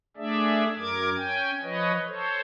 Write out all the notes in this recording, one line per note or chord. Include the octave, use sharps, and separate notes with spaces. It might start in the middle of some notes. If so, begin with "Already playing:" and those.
A3 D4 G#4 D5 E5
F#2 A#4 D6 G#6
C#4 G5 G#5
F3 B4 C#5 D#5
A4 C5 C#5